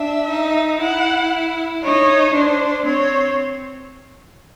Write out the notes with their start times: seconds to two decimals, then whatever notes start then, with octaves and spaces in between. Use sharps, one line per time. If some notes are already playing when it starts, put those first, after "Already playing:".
Already playing: D4 E5
0.30 D#4
0.80 E4 F#5
1.83 D#4 C#5
2.34 D4 C5
2.85 C4 C#5